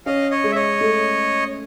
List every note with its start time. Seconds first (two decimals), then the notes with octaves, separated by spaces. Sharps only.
0.06 C#4 D#5 F5
0.31 C#5 D#5
0.44 G#3
0.52 E5
0.55 C#5 D#5
0.81 A3